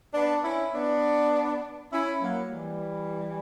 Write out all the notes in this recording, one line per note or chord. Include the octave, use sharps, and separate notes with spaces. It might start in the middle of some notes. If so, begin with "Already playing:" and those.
B3 D4
C#4 E4
B3 D4
C#4 E4
F#3 A#3
E3 G3